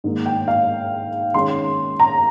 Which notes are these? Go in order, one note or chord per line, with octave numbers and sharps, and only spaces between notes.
G#2 D#3 A#3 D#4
G5
F5
D#3 G#3 C#4 C6
A#5